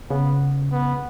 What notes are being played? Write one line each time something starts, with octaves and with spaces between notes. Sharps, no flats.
C#3 B3
B3